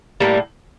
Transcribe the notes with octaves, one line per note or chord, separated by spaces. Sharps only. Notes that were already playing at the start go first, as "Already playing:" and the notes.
A2 G3 A#3